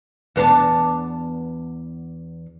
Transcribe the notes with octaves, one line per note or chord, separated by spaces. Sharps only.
E2 B3 D4